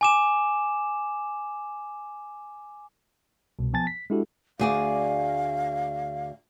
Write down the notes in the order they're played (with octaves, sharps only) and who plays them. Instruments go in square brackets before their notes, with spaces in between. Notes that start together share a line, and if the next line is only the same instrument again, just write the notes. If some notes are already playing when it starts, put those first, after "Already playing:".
[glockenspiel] G#5 D6 E7
[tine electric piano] C2 B2
F3 B3 G#5 A5 A6
B6
G#3 D4 E4 F#4 G4 A4
[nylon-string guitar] D2 G#4 D5 [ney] F5